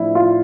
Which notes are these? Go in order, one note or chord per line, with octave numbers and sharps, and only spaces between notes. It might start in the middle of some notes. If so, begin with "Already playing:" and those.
Already playing: A2 F3 A3 D4 E4
F4